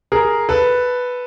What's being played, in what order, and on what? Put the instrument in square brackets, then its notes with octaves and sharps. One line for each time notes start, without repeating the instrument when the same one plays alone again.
[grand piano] G#4 A#4
A4 B4